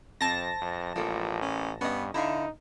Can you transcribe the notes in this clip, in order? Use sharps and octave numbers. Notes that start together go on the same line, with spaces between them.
F2 C4 A5 A#6
F2
A1 F3 G#3 A#3 A4
C#4
G2 B3 C#4 D#5
D3 D#4 E4 E5 F5